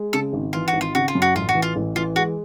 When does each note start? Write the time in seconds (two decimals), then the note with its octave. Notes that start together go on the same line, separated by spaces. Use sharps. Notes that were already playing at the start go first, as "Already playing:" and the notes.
Already playing: G#3
0.13 C#3 A4
0.33 G#1
0.53 E3 F4
0.68 F#4
0.73 G#1
0.81 F4
0.95 C#3 F#4
1.08 F4
1.15 F#2
1.22 F#4
1.35 A1 F4
1.49 F#4
1.55 E3
1.62 F4
1.76 A1
1.96 E3 F4
2.16 G#3 F#4